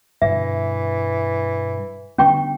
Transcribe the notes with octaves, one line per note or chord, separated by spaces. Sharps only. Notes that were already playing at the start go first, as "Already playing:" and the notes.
G2 B2 D3 E3 E5
D3 G3 B3 C#4 G5 C#6